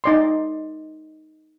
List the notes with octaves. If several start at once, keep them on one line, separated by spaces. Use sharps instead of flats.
D#4 D5 C6